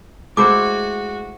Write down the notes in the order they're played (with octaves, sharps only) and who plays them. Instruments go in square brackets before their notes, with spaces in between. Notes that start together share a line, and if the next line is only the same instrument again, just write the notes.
[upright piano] G#3 [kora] A3 E4 C5 [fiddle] F#4 [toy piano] D6